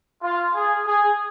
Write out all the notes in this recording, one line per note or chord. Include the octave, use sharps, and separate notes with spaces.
F4
G#4
G#4